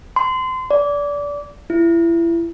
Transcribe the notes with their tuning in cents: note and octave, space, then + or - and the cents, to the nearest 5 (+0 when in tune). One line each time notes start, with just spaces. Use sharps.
C6 -30
D5 -25
E4 +30